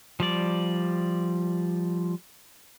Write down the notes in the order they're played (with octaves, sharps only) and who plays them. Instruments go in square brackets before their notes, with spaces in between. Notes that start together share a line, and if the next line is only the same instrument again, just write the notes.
[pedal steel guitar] F3 G3 D5